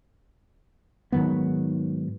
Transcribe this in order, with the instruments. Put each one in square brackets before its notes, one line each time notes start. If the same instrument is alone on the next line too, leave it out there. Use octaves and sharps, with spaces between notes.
[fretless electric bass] G#2 D#3 F#3 B3